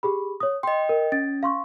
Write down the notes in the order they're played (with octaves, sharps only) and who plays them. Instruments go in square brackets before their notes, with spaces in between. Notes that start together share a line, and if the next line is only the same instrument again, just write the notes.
[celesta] G4 G#4 B5
C#5 D#6
[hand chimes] D#5 G5 [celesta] C6
[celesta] A#4
[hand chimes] C#4 [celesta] A6
[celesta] F5 C6 C#6